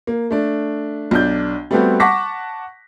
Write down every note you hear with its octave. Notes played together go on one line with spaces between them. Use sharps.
A#3
A3 D4
B1 D4 G6
G3 A3 B3 C4 F#4 G4
F#5 A5 C#6 D6 A#6 B6